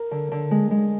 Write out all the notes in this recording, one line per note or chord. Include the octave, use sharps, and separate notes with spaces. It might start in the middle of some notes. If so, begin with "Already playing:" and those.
Already playing: A#4
D3
D3
G#3
G#3